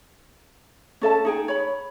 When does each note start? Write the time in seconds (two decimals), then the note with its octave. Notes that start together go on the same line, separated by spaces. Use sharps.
1.01 C#4 A4 D#5 A5
1.25 D#4 G#4 G5
1.48 C#5 B5